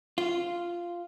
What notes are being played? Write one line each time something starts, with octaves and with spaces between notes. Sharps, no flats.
F4